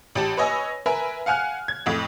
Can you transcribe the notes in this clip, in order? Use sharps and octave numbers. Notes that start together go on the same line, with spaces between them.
A1 G4 A5
B4 C#5 D#5 G#5 E6 A#6
A#4 B4 E5 G#5
F5 F#5 G#5 F6 F#6
G#6
F2 A2